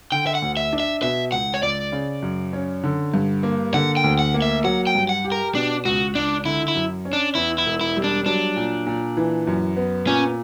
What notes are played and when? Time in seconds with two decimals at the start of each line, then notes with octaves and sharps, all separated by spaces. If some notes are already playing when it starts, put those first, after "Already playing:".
0.12 D3 G5
0.27 E5
0.35 F#5
0.42 D2
0.57 E5
0.73 D4
0.80 E5
1.03 B2 E5
1.32 C#2 F#5
1.54 C#5
1.62 C#2 D5
1.92 C#3
2.22 F#2
2.53 C#4
2.83 D3
3.14 G2
3.43 A#3
3.74 D3 F#5
3.97 G5
4.04 D2
4.19 F#5
4.34 A#3
4.42 E5
4.64 F#3 F#5
4.87 G5
4.95 G2
5.09 F#5
5.25 G4
5.32 A#4
5.55 B2 D4
5.85 C#2 F#4
6.15 C#2 D4
6.45 D3 E4
6.68 E4
6.75 F#2
7.05 C#4
7.13 D4
7.35 E2 E4
7.58 E4
7.66 E1
7.81 E4
7.96 G3
8.04 D4
8.26 F#3 D4
8.56 A#2
8.87 A#2
9.17 E3
9.47 F#2
9.77 B3
10.07 A#2 C#4